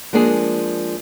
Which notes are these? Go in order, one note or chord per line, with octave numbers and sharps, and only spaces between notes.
F3 G#3 A#3 D4 G#4